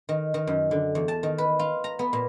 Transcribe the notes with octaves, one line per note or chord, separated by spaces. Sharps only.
D#3
D#3
F#2
D3
E2
A5
D#3
B4
F4
A#5
B3
A#2